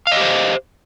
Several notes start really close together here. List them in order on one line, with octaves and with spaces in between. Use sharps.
F5 D#5 G4 C5